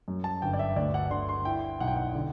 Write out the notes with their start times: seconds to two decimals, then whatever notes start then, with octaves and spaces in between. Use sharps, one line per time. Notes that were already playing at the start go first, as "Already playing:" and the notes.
0.08 F#2
0.24 A5
0.42 G1 G5
0.53 D5
0.59 E5
0.76 D2 D5
0.94 F#5
1.10 D3 C6
1.29 C6
1.45 E4 G5
1.80 B1 F#5
1.87 G5
1.96 F#5
2.15 D3